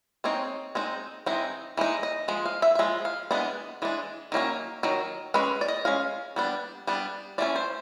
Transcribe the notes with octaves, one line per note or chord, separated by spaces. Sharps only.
G#3 C4 D#4 C#5
G#3 C4 D#4
E3 G#3 C4 D#4
E3 G#3 D#4
D#5
F3 G#3
F5
E5
E5
F3 G#3
F5
E3 G#3 B3 D4
E3 G#3 D4
D#3 F#3 A#3 C#4
D#3 F#3
G#3 C#4 B4
D5
D#5
G#3 C#4 F5
G3 B3 D4
G3 B3 D4
E3 A3 C#4 D5
C5